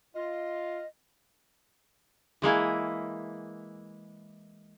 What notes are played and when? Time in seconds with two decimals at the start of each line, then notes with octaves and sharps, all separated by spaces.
0.14 F4 D#5
2.42 E3 G#3 A#3 E4